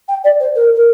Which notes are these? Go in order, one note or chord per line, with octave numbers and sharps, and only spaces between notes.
G5
D5
C5
A#4
A#4